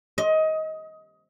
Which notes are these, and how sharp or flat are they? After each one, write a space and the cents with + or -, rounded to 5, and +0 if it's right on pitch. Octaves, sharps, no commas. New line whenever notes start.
D#5 +20